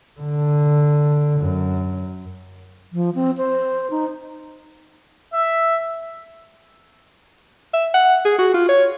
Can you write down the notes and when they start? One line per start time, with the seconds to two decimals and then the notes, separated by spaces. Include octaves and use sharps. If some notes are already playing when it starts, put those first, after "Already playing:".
0.20 D3
1.40 F#2
2.92 F3
3.15 C4
3.37 C5
3.91 D#4
5.33 E5
7.74 E5
7.94 F#5
8.25 G#4
8.39 F#4
8.54 F4
8.69 C#5